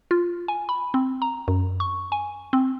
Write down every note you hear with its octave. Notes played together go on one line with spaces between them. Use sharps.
F4
G#5
B5
C4
A#5
F#2
C#6
G#5
C4